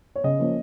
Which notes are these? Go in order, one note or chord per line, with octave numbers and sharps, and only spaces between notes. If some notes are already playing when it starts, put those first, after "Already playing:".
C#5
C#3 D#5
F3 A#3 C#4